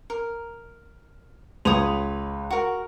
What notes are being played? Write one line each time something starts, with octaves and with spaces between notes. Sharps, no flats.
A#4
C#2 B4 C#5 D#6 F7
F#4 A#4